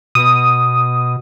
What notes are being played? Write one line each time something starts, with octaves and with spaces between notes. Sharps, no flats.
B2 D#6